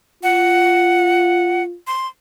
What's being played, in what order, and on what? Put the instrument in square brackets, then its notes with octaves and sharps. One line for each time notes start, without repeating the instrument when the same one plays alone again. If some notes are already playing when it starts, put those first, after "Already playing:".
[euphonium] F4 [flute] F#5
[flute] C6